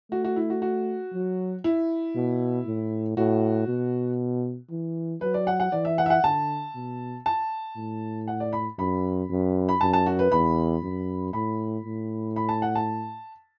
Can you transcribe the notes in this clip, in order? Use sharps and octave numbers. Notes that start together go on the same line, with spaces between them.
A3 F#4
F#4
E4
F#4
F#4
F#3
E4
B2
A2
A2 F#4
B2
E3
F#3 B4
D5
F#5
F#5
E3 D5
E5
F#5
E5
F#5
D3 A5
B2
A5
A2
F#5
D5
B5
F#2 B5
F#2
B5
F#2 A5
A5
F#4
B4
E2 B5
F#2
A2 B5
A2
B5
A5
F#5
A5